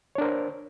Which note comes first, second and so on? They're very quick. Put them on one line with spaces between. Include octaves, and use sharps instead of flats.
C#5 D4 A#4 C5